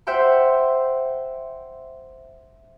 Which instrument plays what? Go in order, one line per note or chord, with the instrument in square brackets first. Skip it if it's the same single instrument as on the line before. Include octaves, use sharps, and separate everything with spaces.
[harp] C5 E5 F#5 G5 C6